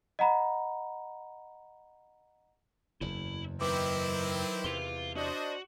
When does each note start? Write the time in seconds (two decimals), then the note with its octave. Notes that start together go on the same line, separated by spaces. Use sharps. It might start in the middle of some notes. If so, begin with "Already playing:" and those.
0.19 D#5 F#5 A#5 B5
3.01 F#1 E2 E4
3.61 D#3 F#3 C4 E4 B4 D6
4.64 E2 C3 F5 C6
5.16 D4 F#4 C5 D#5